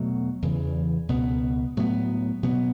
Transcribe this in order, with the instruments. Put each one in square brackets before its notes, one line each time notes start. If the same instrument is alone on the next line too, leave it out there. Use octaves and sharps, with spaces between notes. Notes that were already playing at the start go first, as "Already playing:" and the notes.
Already playing: [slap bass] E2 B2 F#3 A3
E2 C#3 E3
C#2 B2 B3
A2 F#3 B3
B2 F#3 B3